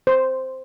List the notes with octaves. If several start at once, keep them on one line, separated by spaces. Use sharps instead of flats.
C5